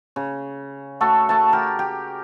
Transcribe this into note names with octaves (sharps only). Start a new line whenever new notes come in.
C#3
A3 F#4 A4
A3 A5
G4 A#4
G4